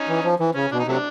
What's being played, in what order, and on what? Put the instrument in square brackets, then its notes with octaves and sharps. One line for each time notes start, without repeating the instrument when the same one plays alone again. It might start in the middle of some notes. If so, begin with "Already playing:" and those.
Already playing: [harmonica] C#4 D#4
[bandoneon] E3
F3
E3
[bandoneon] C#3 [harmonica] C#4
[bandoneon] B2 [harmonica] D4
[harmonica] D#4
[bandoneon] C3 [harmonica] F#3 A3 D4